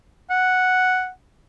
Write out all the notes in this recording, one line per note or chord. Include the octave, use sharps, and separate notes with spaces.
F#5